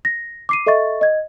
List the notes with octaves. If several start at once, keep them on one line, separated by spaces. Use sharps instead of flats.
A#6
D6 C7 D#7
A4 D#5 E5 C#6 A6
D#5 G#6